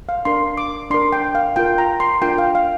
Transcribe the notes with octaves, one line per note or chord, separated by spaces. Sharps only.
F5
D4 A#4 C6
D6
D4 A#4 C6
G5
F5
F4 A#4 G5
A#5
C6
D4 F4 A#4 G5
F5
F5